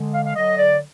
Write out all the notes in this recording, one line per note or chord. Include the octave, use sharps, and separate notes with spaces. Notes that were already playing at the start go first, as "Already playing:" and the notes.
Already playing: D3 G#3
F5
F5
D3 F#3 D#5
D5